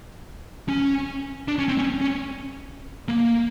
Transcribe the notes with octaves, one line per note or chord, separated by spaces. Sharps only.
C#4
D4
C#4
C4
C#4
C#4
A#3